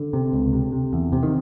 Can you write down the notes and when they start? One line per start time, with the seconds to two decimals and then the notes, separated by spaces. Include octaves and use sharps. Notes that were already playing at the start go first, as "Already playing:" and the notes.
Already playing: D3
0.13 C3
0.33 C#2
0.53 C3
0.72 C3
0.93 E2
1.13 C3
1.23 D#3